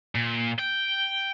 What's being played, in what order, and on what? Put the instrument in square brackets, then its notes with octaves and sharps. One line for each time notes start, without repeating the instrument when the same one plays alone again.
[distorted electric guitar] A#2
G5